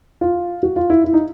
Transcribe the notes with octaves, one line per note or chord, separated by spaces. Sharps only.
F4
F#4
F4
E4
E4
D#4